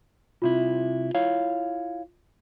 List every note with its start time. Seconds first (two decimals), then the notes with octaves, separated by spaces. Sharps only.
0.42 C2 C3 E4 F4
1.15 E4 C#5 F5